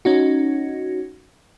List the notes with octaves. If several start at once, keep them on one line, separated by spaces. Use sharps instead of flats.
C#4 D#4 F#4